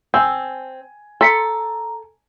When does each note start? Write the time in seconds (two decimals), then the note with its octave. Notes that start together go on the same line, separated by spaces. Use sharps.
0.14 C4 G#5 E6
1.21 A4 A#5 C6 B6 C#7